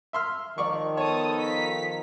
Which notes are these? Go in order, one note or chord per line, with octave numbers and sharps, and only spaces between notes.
E5 C6 F6
D#3 F3 A#4 D5 C#6
B3 A4 C#5 A5 D#6
A#5 B6